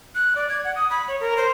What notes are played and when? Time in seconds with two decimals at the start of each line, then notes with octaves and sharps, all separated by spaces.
0.15 F#6
0.36 D5
0.49 G#6
0.64 F#5
0.76 D#6
0.90 B5
1.08 C#5
1.20 A#4
1.37 C5